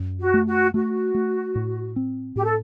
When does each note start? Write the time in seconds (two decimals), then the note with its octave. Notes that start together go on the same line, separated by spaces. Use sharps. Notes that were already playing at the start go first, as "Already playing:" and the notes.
Already playing: F#2
0.19 F#4
0.34 A3
0.47 F#4
0.74 A3 F#4
1.14 A3
1.55 A2
1.96 C4
2.36 A2 G4
2.44 A4